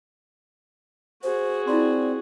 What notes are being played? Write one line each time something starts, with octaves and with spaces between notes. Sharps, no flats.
F#4 G#4 C5
C4 E4 F4 D5 C6